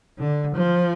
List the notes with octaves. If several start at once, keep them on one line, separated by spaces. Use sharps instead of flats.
D3
F3